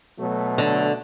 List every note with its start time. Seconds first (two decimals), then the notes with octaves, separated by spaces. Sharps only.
0.19 B2 F#3 A3
0.58 D3